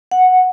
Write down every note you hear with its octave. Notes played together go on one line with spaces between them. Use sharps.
F#5